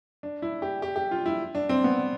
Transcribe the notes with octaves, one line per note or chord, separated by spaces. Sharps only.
D4
E4
G4
G4
G4
F4
E4
D4
C4
B3